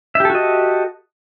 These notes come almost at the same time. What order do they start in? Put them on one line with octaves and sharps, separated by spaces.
E5 G4 A4 F#4 D#5